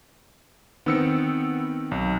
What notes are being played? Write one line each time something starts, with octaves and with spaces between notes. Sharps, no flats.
D#3 B3 C4 E6 C#7
B1